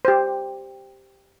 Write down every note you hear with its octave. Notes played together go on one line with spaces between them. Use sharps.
G4 C5